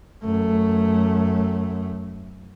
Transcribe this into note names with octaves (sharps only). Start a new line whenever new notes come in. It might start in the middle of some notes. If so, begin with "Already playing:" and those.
F#2 A3